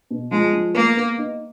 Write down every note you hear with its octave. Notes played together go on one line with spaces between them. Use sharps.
B2
F3 G#3
F3
A#3 B3
B3
D#4